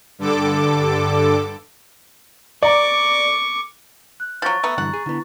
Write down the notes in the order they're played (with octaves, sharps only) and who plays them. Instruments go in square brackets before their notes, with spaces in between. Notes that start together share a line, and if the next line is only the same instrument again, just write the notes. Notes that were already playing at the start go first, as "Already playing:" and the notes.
[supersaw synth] G2 D3 A4 D6
[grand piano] D5 A#5 [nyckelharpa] C#6 D6
[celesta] F#6
[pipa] F3 F#3 [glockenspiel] C#6 A6
[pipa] A3 B3 [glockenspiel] A#5
[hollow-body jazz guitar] G2 D3 E3 [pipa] F#5
[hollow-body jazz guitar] G#4
[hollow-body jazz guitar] D3 B3 [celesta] E4